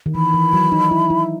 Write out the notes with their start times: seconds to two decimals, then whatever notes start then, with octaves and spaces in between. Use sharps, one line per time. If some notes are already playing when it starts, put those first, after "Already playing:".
0.06 D#3
0.15 E3 B5
0.34 E3
0.53 F#3
0.72 D#4
0.91 E4
1.10 E4